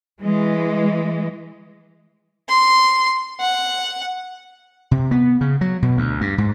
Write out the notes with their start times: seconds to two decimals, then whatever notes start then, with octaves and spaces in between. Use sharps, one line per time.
0.21 E3 G#3
2.49 C6
3.41 F#5
4.91 C3
5.11 B3
5.41 C#3
5.61 F#3
5.82 B2
5.97 D2
6.21 G2
6.38 G#2